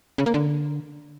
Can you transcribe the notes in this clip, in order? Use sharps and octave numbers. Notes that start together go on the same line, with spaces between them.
C#3
A#3
D3